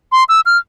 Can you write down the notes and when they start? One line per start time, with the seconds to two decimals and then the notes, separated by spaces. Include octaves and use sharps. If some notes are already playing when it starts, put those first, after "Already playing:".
0.12 C6
0.29 E6
0.46 F6